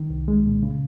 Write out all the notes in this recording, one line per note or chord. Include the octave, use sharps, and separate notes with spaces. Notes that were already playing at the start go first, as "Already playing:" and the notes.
Already playing: D#3
C2
G#3
A#2
C#3